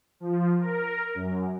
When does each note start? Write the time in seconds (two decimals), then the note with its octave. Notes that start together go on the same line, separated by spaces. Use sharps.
0.20 F3
0.59 A#4
1.15 F#2